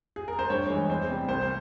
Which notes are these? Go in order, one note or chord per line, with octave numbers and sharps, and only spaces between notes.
G#4
A#4
C5
G2 C#5
E3 G#3
E2 C5
C3 G3
C2 C5